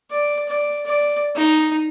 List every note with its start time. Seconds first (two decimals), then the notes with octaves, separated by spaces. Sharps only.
0.11 D5
0.48 D5
0.86 D5
1.36 D#4